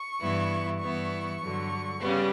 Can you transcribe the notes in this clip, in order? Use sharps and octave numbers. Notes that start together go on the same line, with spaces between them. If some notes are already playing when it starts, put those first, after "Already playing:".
Already playing: C#6
G2 E3 B3 E4
G2 E3 B3 E4 C#6
G2 D3 F#3
C#3 G3 B3